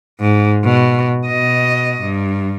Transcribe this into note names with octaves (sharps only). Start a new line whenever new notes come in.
G#2
B2
B2 D#5
G2